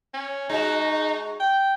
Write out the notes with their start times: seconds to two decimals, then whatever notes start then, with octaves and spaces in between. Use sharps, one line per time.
0.14 C#4
0.49 G#3 D#4 F#4
1.40 G5